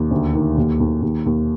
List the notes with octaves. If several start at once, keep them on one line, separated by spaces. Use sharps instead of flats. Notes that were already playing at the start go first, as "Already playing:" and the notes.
Already playing: D#2
D2
D#3
D#2
D#2
D#2
D#2